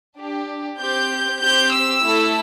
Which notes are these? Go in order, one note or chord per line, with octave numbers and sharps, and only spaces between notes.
D4 G4
C4 G4 G6
C4 G4 G6
E6
A3 E4 A4